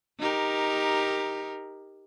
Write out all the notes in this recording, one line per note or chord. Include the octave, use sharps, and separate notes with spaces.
D#4 G4 A#4